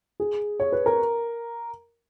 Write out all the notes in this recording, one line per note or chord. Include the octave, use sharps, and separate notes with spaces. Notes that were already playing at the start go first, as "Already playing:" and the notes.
G#4
C#5
B4
A#4